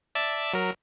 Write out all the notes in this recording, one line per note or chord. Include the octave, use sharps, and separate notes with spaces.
D5 E5 A5
F#3 A#4